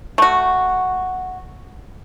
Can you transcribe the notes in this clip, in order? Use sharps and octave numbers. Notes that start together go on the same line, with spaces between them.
A3 F#4